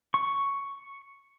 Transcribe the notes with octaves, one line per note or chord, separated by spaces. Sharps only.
C#6